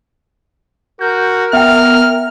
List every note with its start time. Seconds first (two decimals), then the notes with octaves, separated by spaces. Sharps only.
1.01 F#4 A#4 G6
1.53 B3 E5 G5 F6